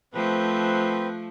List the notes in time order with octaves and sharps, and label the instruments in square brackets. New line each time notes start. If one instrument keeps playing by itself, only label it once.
[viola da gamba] F3 A3 [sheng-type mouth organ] C4 B4